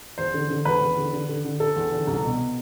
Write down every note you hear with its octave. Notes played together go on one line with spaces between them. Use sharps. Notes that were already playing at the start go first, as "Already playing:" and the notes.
E2 C5
D3
D3
E2 B4
E2
D3
D3
D3
D3
D3 A4
E2
D3
C2
B2